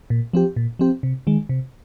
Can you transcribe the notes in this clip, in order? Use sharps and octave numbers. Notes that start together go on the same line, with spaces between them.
A#2
F3 C4 G4
A#2
F3 C4 G4
C3
D#3 G#3
C3